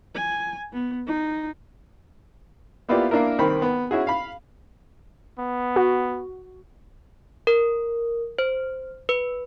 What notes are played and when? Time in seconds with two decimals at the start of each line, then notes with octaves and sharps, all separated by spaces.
0.15 G#5
0.72 B3
1.07 D#4
2.89 A#3 B3 E4 F4 G4 D5
3.11 A#3 D4 E4 A#4
3.38 C2 D#3 C4 B5
3.62 B3
3.91 C#4 E4 F#4 G#4
4.07 F5 B5
5.39 B3
5.76 F#4
7.47 A#4
8.39 C5
9.09 B4